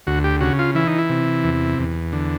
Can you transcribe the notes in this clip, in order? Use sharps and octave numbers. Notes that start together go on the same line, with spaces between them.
D2 F#4
G4
C#3 F#4
F4
E3 E4
D#4
E4
C3
E2
E2
D3